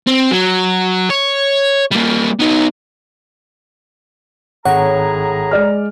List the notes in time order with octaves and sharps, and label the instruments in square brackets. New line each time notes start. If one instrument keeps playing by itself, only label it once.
[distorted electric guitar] C4
F#3
C#5
G3 A#3
B3 D#4
[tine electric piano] G#1 [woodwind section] A2 G#4 A#5 [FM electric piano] C#5 F#5
[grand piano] G#3 D5 F6